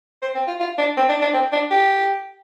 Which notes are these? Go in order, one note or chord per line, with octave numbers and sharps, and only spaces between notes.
C5
C4
F4
F4
D4
C4
D4
D4
C4
D4
G4